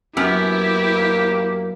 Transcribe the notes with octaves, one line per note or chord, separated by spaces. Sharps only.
F#2 A#3 B3 E4 G4